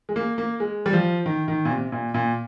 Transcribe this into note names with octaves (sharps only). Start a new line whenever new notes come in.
G#3
A#3
A#3
G#3
G3
F3
D#3
D#3
A#2
C3
A#2
A#2